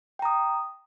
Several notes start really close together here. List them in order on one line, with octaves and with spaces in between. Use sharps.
G5 A#5 D#6